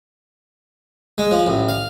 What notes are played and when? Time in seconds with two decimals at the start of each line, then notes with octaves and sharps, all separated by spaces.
1.18 G#3
1.31 F3
1.46 A1
1.69 F5